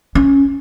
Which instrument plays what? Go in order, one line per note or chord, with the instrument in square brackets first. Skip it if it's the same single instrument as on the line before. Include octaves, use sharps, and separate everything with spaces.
[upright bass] C#4